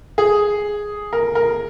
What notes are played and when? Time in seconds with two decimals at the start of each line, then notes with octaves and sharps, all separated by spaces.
0.18 G#4
1.13 A#4
1.35 A#4